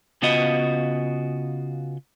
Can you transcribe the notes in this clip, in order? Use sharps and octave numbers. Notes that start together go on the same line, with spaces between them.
C#3 B3 F4 F#4 D#5